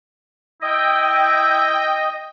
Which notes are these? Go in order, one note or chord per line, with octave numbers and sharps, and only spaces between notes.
E4 D#5 G5